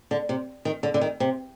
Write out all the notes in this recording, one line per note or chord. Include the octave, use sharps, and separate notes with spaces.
D3
C3
D#3
D3
D3
D#3
C3